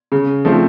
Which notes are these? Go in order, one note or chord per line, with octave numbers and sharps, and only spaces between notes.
C#3
F3 A3 C4